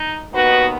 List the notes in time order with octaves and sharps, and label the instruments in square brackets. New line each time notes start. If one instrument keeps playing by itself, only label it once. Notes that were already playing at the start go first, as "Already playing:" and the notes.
Already playing: [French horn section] D#4
D#2 D#3 B3 D#4 F#4 B4